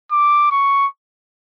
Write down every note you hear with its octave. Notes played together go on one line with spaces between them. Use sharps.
D6
C#6